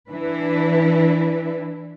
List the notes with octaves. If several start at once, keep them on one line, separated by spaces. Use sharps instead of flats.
E3 D4 E4 B4